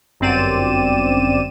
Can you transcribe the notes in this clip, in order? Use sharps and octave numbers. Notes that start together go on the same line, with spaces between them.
G1 F#2 C4 D5 D#7 E7